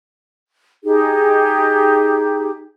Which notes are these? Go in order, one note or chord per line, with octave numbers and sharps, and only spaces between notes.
D#4 G4 G#4